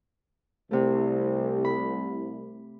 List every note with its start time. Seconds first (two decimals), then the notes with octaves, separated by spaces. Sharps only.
0.71 C2 C3 A3
1.65 B5